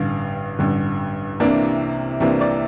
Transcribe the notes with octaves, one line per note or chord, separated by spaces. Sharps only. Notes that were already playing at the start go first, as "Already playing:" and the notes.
Already playing: A1 G2 D3 F5
A1 G2 D3
C2 C3 E3 A#3 D4
C2 C3 E3 A#3 D4
D5